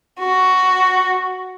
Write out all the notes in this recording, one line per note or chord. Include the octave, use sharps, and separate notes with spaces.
F#4